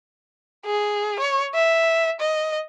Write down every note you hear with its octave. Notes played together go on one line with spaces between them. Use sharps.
G#4
C#5
E5
D#5